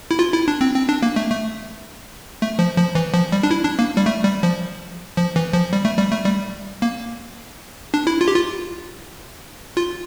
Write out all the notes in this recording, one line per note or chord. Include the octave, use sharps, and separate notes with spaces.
E4
F4
E4
D4
C4
C4
D4
A#3
A3
A3
A3
F3
F3
E3
F3
G3
D4
E4
D4
A#3
G3
A3
G3
F3
F3
E3
F3
G3
A3
G3
A3
G3
A#3
D4
E4
F4
G4
F4
F4